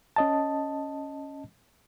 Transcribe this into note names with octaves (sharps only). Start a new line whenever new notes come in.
C#4 D#5 A5